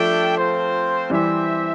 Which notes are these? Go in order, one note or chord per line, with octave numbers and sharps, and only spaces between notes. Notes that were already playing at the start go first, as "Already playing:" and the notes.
Already playing: F3 G3 A3 D4 A4 E5 G5
C4 F4 C5
E3 G3 C4 G4 C5 E5